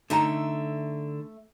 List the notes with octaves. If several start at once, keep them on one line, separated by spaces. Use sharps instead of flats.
D3 A3 D#4 E5 A#5